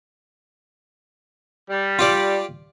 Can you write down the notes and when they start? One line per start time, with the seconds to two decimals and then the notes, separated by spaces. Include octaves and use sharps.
1.70 G3
1.99 F4 G4 D5